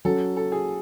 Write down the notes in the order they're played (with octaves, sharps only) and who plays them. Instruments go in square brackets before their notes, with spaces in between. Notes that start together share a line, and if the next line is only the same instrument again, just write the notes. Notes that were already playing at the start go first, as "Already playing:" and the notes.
[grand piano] F#3 C#4 F#4 [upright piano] A4
[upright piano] A4
G#4